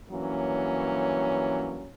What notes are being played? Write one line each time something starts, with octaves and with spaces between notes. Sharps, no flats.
G2 E3 F#3 A#3 C#4